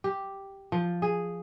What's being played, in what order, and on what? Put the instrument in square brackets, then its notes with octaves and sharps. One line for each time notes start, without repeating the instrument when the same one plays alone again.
[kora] G4
F3
G#4